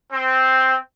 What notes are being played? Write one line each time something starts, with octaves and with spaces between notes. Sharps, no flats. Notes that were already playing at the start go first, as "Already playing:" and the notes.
C4